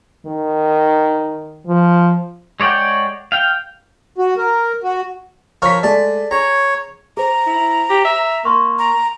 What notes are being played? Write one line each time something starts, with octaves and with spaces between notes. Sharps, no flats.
D#3
F3
G#3 C#5 D5 F#5 G5
F5 G5
F#4
A#4
F#4
F3 A#4 C#5 C#6 B6
G#3 A3 G#4 D5 A5
G#4 C#5 A#5
G#4 C5 A#5
E4
G4
E5
A#3 C6 C#6
A#5